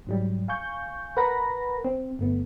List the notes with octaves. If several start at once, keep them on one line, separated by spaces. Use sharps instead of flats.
G#2 F#3 G3
F5 G#5 C#6 G6
A#4 B4 F#5 B5 A#6
C4
G1 A3 B3